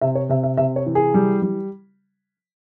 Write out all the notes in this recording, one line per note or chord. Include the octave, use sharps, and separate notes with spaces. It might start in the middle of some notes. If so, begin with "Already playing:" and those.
C3 E5
C#5
C3 E5
E5
C3 E5
C#5
E3
G#4
G3
G3